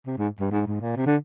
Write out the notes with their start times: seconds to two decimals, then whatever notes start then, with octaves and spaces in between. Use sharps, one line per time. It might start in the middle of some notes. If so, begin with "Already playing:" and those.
0.06 C3
0.18 G#2
0.40 G2
0.51 G#2
0.66 G#2
0.81 A#2
0.96 C3
1.06 D3